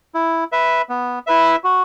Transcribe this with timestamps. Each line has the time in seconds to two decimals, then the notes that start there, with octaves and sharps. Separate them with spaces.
0.14 E4
0.52 B4 E5
0.89 B3
1.27 E4 B4 E5
1.64 F#4